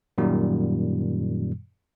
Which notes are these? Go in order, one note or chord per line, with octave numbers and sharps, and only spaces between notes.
F#2 A#2 D#3 G3